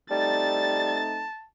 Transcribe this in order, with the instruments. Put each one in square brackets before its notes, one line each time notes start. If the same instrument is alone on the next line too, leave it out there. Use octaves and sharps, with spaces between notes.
[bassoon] G3 [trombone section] A3 C4 D#4 [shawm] A5 [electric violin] A6